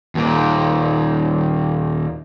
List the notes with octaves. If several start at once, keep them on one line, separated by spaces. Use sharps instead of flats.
D#2 A#2